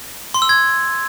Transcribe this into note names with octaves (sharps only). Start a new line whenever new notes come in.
C6
E6
G#6